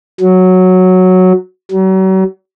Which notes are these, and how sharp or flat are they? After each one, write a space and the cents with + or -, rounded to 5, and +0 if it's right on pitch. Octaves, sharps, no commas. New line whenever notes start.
F#3 -5
F#3 +40